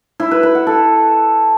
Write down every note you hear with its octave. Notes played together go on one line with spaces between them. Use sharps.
E4
B4
B4
F#5
A4